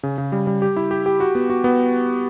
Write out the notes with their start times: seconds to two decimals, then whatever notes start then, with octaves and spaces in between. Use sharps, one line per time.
0.03 C#3
0.18 C#3
0.32 G3
0.47 G3
0.62 G4
0.76 E4
0.91 G4
1.06 G4
1.20 F#4
1.35 B3
1.50 F#4
1.64 B3